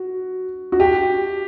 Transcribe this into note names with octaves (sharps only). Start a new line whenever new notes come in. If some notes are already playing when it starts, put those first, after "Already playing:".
Already playing: F#4
F#4
G4